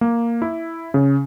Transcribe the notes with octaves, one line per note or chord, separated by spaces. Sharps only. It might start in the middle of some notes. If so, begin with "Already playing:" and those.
A#3
E4
C#3